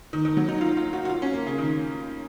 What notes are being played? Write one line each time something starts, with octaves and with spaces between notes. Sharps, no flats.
D#3
D#3
F#3
D#4
F4
F4
F#4
F#4
F4
C#4
A#3
C#3
D#3